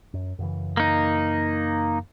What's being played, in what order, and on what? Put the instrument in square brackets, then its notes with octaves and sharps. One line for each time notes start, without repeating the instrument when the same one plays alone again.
[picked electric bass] F#2
F#2 C#3 E3
[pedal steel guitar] A#3 D#4